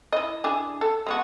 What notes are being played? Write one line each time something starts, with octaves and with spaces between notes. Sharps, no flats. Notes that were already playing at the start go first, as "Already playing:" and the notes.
E4 D#5
D4 E4 G#4
A4
G#3 B3 F#4